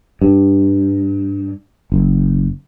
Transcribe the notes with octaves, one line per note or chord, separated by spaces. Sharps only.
G2
F#1